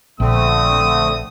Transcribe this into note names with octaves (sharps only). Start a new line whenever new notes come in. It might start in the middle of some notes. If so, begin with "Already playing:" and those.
A#1 D3 A3 C4 D#6